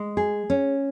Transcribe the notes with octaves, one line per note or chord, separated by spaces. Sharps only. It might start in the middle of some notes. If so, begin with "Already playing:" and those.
Already playing: G#3
G#4
C#4